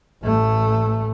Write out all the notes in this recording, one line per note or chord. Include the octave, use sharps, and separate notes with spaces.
A1 A3